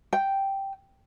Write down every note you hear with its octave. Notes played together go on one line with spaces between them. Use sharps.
G5